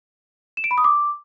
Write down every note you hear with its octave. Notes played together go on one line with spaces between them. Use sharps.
E7
D7
B5
D#6
D6